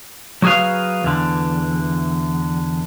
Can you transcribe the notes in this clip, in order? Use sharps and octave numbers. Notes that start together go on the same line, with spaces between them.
F#3 F#4 G#4 B4 F5
E2 D3